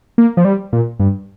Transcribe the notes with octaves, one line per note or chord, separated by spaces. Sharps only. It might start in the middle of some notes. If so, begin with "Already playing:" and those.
A#3
F3
G3
A#2
G2